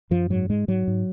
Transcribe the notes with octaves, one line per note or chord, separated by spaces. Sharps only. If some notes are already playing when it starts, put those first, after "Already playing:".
F#2 F3
G#2 F#3
G#2 G#3
G#2 F#3
G#2